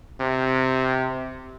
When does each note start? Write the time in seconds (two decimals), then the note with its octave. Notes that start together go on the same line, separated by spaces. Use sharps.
0.21 C3